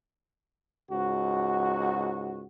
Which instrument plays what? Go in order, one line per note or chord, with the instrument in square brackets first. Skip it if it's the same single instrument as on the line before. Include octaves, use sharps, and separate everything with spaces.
[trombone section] C#2 G#2 F#4